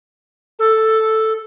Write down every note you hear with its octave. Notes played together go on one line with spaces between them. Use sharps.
A4